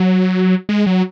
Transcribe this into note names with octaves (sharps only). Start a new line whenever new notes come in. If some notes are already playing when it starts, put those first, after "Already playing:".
Already playing: F#3
G#3
F#3